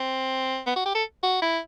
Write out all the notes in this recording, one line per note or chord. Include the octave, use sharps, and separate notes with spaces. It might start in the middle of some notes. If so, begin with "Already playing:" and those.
Already playing: C4
B3
F#4
G4
A4
F#4
E4